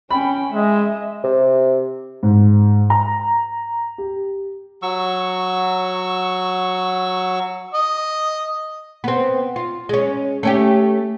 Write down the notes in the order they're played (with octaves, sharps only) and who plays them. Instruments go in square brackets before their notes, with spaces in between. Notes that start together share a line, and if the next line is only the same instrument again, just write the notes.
[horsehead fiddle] C#4 G5 [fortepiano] B5
[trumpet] G#3 [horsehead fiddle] D#5 E5
[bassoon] C3
[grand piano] G#2
A#5
G4
[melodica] F#3 C#6 E6
[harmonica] D#5
[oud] B3 C4
F4
G#3 C#4
A3 C#4 G4